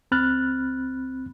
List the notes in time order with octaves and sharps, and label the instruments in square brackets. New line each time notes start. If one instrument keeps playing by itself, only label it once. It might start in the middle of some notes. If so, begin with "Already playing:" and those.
[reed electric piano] C#2 C4 B5 F6 F#6 A6